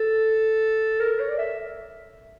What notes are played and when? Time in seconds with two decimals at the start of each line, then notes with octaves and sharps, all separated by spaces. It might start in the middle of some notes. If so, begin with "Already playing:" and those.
Already playing: A4
1.00 A#4
1.20 C#5
1.29 D5
1.38 E5